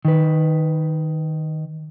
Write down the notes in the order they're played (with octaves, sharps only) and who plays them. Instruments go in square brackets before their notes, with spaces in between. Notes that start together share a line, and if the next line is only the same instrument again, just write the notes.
[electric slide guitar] D#3 B4